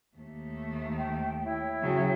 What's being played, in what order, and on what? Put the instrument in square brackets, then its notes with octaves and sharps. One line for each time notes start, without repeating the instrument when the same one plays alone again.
[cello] D#2 A3
[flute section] G5
E4 C#5 G5
[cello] C#3 F#3